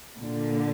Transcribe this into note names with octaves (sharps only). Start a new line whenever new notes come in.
A#2 D3